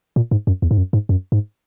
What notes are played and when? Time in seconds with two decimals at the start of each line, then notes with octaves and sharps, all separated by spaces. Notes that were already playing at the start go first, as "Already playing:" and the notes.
0.16 A#2
0.31 G#2
0.47 F#2
0.62 E2
0.71 G#2
0.78 F#2
0.93 G#2
1.09 F#2
1.32 G#2